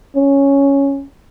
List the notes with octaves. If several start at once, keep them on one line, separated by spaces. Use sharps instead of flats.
C#4